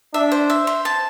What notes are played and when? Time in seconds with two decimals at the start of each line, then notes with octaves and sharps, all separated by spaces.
0.14 D4 E5
0.32 C5
0.50 E5
0.67 C5
0.85 A5